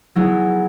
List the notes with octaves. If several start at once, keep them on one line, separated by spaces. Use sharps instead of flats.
F#3 B3 E4 G#4